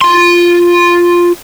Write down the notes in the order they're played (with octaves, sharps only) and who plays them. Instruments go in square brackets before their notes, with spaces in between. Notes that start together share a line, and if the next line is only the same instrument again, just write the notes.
[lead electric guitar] F4 C6